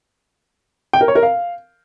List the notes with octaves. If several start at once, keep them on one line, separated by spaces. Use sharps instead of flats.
G5
A#4
C#5
A#4
F5